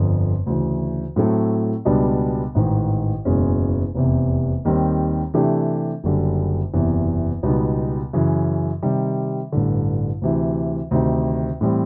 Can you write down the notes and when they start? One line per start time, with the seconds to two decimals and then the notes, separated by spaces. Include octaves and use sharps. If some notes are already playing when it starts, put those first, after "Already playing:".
Already playing: G1 F2 D3
0.46 D2 C#3 E3
1.16 A2 F#3 A3 C4
1.85 C#2 B2 G3 B3 D4
2.55 A1 G#2 D#3
3.25 F#1 E2 B2 G#3 C#4
3.95 F1 E2 C3
4.65 D#2 D#3 G3 C4
5.34 C3 E3 A3 D4 G4
6.04 F#1 F#2 D3 G3
6.73 F#1 E2 C3 E3
7.43 C#2 B2 G3 B3 D#4
8.13 F#2 C#3 E3
8.82 C3 D#3 G3
9.52 A1 G2 D3
10.22 D2 C3 E3
10.91 D2 C3 D#3
11.61 A2 E3 G3 C4